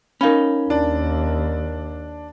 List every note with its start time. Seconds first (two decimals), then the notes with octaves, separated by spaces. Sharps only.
0.21 C#4 D#4 A#4 F5 B5
0.70 D#2 D4